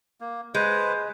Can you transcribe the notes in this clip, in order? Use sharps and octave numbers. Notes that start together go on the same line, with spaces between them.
A#3
G#3 B4 C5